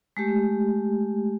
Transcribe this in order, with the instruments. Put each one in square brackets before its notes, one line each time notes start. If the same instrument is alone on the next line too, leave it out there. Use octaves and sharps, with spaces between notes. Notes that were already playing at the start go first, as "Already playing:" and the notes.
[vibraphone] G#3 A3 G4